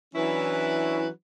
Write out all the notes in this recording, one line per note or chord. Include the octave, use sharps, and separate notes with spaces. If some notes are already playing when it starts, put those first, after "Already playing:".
E3 F#3 C#4 D4 E4 B4